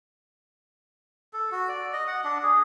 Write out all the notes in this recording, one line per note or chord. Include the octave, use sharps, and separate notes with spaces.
A4
F#4
D5
D#5
F#5
D4
G#4